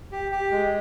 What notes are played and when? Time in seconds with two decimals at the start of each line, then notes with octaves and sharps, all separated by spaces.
0.12 G4
0.32 G4
0.52 G#3